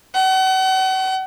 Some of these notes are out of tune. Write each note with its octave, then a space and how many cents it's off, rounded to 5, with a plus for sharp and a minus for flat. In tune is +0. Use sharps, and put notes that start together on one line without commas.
F#5 +40